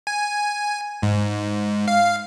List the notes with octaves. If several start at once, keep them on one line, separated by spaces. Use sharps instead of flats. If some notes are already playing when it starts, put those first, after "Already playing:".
G#5
G#2
F5